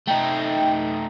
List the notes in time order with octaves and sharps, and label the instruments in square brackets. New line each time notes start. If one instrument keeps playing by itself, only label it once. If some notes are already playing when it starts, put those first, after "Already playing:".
[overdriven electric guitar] A3 D#4 [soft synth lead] G5